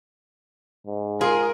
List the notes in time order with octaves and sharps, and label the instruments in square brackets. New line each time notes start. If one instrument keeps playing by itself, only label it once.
[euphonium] G#2
[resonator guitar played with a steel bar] F4 [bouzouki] G#4 [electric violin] A#4